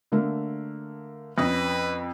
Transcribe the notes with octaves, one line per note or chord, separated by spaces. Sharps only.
D3 A3 A#3
F2 C#4 B4 D#6 A#6